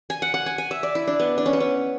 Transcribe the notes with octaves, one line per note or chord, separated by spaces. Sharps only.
G#5
F#5
F#5
G#5
G#5
E5
D5
E4
D4
B3
D4
C#4
B3
C#4